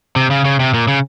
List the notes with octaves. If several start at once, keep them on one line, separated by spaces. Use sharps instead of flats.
C3
C#3
C#3
C3
A#2
C#3